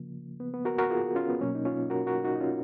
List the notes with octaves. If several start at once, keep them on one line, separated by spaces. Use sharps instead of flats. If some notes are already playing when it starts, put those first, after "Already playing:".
Already playing: C#3 F3 A#3
B3
B3
F#4 A#4
F#4 A#4
F4 G#4
C#4 F4
B3
B2 F#3 A#3 C#4
D#4
C#4 F4
F#4 A#4
F#4 A#4
D#4 F#4
D#4
C#4 F4